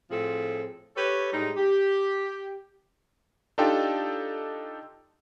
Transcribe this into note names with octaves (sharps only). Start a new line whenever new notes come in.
A2 F3 C4 G#4 A4
G4 A4 B4 C#5
A2 G3 G#3 D#4
G4
D4 D#4 F4 G4 A4 G5